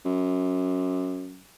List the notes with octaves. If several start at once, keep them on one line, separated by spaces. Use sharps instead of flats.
F#2